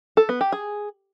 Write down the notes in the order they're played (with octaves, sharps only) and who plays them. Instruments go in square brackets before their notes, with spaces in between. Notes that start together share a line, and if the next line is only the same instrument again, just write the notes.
[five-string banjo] A4
B3
G4
G#4